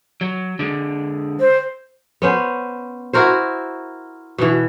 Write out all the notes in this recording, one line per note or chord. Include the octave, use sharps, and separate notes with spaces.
F#3
D3 G#3
C5
B3 C#4 C5
E4 F#4 A#4 C5
B2 E3